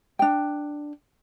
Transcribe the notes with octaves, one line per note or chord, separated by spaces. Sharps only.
D4 G5